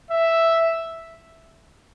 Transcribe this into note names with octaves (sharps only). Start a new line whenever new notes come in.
E5